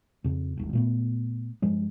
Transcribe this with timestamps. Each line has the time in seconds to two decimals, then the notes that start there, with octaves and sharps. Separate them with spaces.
0.24 F2 C#3
0.57 D#1 G#1
0.73 A#2 A3 B3
1.62 G2 F3 G#3